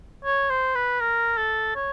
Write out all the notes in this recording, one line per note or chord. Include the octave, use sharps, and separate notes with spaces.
C#5
C5
B4
A#4
A4
C#5